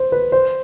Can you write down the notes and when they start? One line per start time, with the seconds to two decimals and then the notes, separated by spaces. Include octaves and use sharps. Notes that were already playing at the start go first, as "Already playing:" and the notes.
Already playing: C5
0.12 B4
0.32 C5